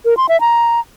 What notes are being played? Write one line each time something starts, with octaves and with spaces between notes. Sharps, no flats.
A#4
C6
E5
A#5